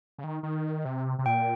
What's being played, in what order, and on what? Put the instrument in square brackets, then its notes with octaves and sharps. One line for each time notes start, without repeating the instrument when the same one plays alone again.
[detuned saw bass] C#3
D#3
D#3
C3
C3
[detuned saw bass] A#2 [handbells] G5